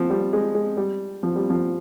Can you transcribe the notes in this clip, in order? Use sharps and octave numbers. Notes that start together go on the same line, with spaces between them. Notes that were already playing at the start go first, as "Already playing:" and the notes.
Already playing: F3
G3
G#3
G#3
G3
F3
G3
F3